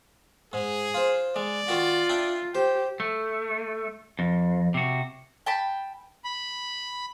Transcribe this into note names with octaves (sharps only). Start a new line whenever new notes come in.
G#2 G#4
F4 C5
G#3 D5
D#3 F4 F#4
D4 E4 G5
G4 C5
A3
F2
C3 F#4
G5 A5 B5
B5